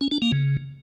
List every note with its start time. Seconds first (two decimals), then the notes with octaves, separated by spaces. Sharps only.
0.01 C#4
0.11 D4
0.22 A#3
0.32 C#3